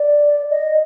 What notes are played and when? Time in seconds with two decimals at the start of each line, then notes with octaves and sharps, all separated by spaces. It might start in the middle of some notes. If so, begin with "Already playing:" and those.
Already playing: D5
0.51 D#5